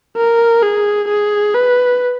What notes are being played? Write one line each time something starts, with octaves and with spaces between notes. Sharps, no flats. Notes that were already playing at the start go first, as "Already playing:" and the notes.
A#4
G#4
G#4
B4